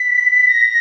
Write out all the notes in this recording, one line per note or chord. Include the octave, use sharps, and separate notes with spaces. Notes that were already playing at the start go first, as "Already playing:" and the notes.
Already playing: B6
A#6